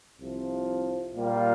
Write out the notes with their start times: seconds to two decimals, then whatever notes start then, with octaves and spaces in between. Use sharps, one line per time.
0.18 C2 C3 F3
1.14 A#2 G3 A#3 F4